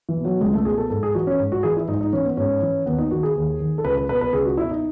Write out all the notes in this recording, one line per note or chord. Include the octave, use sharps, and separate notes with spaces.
E3
B2
F#3
C#2 G#3
A3
B2 G#4
A4
G#2 A4
G#4
E3 F#4
C#4
G#2
F#4
E3 G#4
E4
G#2 D#4
D#4
E3 C#4
B3
G#2 C#4
E3
D#2 B3
D#4
D#3 F#4
G#4
D#2
D#3
A4
C#2 B4
B4
B2 B4
B4
C#2 G#4
F#4
B2 E4
D#4